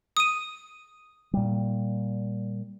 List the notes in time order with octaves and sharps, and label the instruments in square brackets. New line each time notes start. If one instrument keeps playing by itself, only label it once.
[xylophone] D#6 D#7
[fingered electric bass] A#2 G3